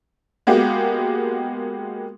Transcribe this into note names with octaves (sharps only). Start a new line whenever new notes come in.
G#3 A#3 B3 F#4 G4